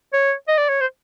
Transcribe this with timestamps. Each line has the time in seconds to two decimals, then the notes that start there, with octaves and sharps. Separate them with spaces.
0.13 C#5
0.48 D#5
0.58 D5
0.69 C#5
0.81 C5